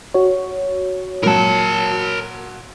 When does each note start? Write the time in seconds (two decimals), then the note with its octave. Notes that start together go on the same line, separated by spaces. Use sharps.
0.14 F#4 C#5
1.23 A#2 F#3 A#4 A5